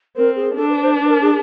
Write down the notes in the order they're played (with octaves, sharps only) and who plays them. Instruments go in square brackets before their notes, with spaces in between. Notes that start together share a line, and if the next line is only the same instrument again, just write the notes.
[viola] C4 [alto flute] A#4
[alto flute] G#4
[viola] D4 [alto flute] A4
[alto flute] B4
C5
B4
A#4
G#4